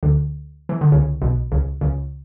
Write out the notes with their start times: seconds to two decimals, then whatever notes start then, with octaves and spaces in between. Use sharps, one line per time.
0.03 D2 D3
0.69 E3
0.81 D3
0.92 C#2 C#3
1.22 B1 B2
1.52 C#2 C#3
1.81 C#2 C#3